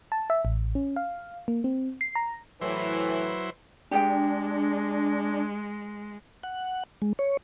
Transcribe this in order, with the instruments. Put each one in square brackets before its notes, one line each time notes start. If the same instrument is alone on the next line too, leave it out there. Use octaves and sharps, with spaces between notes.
[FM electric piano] A5
E5
A1
C#4
F5
A#3
C4
C7
A#5
[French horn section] A2 E3 [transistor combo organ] F#3 E4 C5 [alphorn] B4
[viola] G#3 [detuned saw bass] D4 [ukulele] G4 G#4 G5
[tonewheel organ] F#5
G#3
C#5